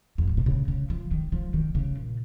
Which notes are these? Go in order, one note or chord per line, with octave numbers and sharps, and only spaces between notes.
F2
G#2
A#2
C#3
C#3
F3
D#3
F3
D#3
C#3
A#2